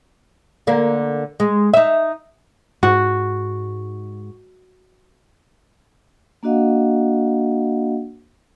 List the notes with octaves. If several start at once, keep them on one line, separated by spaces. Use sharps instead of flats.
D3 A#3
G#3
D#4 E5
G#2 F#4
A#3 D4 F#4 D#5 F5 F#5